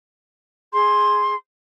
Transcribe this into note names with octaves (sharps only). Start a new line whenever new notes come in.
G#4 C6